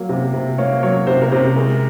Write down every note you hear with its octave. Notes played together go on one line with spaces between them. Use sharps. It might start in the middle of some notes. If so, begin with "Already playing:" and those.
Already playing: F#3 A#3
C3
C3
A#3 C#5
F#3 C#5
C3 C5
A#4
C3 C5
G#3 A#4